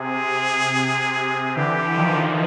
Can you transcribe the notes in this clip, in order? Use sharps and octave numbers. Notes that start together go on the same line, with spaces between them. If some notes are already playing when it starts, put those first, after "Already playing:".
Already playing: C3 G#4
D3 E3 G4
D#3 F3